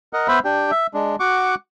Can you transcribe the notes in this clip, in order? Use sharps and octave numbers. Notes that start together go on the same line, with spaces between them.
A#4 D#5 F#5
B3 B4 C5 E5 B5
D4 G4 G5
E5
G#3 D4
F#4 F#5 C#6 D6